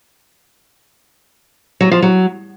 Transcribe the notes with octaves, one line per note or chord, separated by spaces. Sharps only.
F#3
F3
F#3